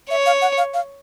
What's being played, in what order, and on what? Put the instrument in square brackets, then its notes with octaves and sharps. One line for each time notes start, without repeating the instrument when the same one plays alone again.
[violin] C#5 [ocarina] E5
[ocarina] F5
F#5
F5
F5